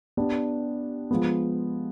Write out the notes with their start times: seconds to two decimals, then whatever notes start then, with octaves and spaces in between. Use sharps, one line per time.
0.17 B3 D4 G4
1.11 F3 G#3 B3